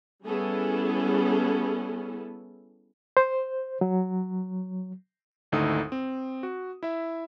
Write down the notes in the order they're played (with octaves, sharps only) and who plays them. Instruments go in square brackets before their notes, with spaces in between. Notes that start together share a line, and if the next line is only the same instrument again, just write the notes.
[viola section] G3 B3 C#4 E4 G#4 A4
[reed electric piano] C5
F#3
[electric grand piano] G#1 D2 D#4 E4 A4 D#6
C4
F#4
E4 E5